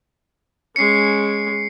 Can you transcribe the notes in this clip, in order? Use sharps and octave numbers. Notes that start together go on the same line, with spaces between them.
G#3 C#4 C7 C#7